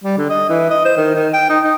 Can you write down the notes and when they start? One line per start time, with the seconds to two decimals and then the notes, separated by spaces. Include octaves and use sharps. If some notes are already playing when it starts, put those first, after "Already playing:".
0.04 G3
0.17 D3
0.30 D#5
0.49 E3
0.70 D#5
0.85 C5
0.97 D#3
1.15 D#3
1.33 G5
1.50 D#4
1.64 D#4